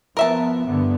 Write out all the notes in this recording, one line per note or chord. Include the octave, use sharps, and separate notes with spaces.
F3 B3 A#4 E5 A5
G2 D3 B3